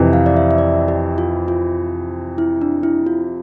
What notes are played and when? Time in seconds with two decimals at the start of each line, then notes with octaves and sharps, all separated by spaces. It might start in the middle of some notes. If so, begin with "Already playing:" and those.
Already playing: F2 C3 E3
0.13 F5
0.26 D5
0.37 E5
0.51 E5
0.58 D5
0.88 G4
1.18 F4
1.48 F4
2.38 E4
2.61 D4
2.83 E4
3.07 F4